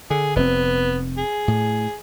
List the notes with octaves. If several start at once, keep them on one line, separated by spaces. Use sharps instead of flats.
D3 G#4
F1 B3 C4
G#4
A2